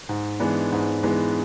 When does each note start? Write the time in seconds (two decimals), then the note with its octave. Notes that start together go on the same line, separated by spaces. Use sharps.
0.09 G#2
0.40 E3 G#3 B3 D4
0.72 G#2
1.03 E3 G#3 B3 D4